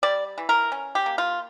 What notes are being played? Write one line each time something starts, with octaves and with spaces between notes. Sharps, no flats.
G3 D5
E3
A#4
C#4
G4
A#3
F4